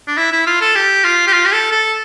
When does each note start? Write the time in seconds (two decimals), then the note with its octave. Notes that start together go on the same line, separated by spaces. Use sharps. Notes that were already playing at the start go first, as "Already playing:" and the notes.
0.07 D4
0.17 E4
0.32 E4
0.46 F4
0.61 A4
0.75 G4
1.04 F4
1.27 G4
1.33 F4
1.46 G4
1.52 A4
1.72 A4